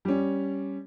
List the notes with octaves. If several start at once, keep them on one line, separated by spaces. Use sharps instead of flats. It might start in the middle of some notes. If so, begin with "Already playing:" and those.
G3 C#4